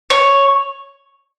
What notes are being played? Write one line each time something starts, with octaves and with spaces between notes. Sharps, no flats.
C#5